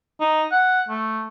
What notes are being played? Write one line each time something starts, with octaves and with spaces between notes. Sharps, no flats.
D#4
F#5
A3